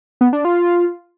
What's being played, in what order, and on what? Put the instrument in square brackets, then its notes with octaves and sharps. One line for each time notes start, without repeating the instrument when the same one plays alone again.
[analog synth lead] B3
D4
F4